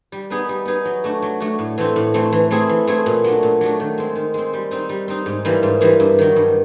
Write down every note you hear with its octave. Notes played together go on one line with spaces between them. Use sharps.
G3
B3 D#4 G#4 B4
G3
B3 D#4 G#4 B4
F#3
A3 D4 F#4
F#3
A3 D4 F#4
A2
E3 A3 C4
A2
E3 A3 C4
E3
A3 C4 E4 G#4
E3
A3 C4 E4 G#4
A#2
F#3 A3 D4
A#2
F#3 A3 D4
D#3
G#3 C4
D#3
G#3 C4
G3
C4 D#4
G3
C4 D#4
G#2
E3 G3 A#3
G#2
E3 G3 A#3
G2
D#3 F#3
G2